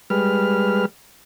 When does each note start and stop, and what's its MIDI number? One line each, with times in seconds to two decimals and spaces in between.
0.10 0.85 55
0.10 0.85 56
0.10 0.85 71
0.10 0.85 89